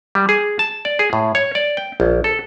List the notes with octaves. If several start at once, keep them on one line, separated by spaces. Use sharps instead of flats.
G3
G#4
A5
D5
G#4
A2
C#5
D5
G5
A#1
A4